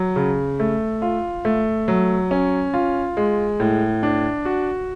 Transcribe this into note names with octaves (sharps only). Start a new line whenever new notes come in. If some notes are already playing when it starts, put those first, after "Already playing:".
Already playing: F#3
C#3
A3
F4
A3
F#3
C#4
F4
G#3
A2
D4
F#4